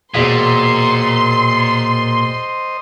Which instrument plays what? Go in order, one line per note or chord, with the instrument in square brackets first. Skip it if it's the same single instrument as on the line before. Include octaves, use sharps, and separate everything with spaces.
[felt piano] E1 B6 [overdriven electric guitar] A#2 [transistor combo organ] C5 D#5 [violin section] C6